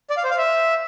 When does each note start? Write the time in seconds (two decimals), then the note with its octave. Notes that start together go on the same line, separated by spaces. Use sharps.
0.10 D5
0.17 F5
0.24 C5
0.31 F5
0.38 E5